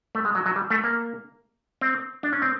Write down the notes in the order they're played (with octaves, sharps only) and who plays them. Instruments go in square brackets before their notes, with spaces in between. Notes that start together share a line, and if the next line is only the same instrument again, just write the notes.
[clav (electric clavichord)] A3
G#3
F#3
F#3
G3
A3
A#3
C4
D4
C#4
C4